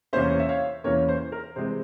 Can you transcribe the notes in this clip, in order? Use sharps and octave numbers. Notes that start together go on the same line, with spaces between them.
E2 C3 E3 A#3 C#4 C5 E5
E5
C#5 F5
E2 C3 E3 A#3 C#4 A#4 C#5
C5
A#4
C3 E3 G#3 C4 C5